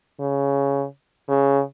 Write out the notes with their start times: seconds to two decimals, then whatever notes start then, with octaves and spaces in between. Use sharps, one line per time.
0.19 C#3
1.29 C#3